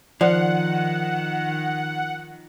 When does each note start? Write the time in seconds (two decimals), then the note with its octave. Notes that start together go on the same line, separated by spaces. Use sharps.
0.21 D#3 F3 D5 F#5